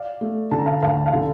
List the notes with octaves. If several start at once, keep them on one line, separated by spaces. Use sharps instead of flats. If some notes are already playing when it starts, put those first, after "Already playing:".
Already playing: D5 F5
A3
D3 A5
A#5
F5 A5
D2 F5 A5
F5 A5
D3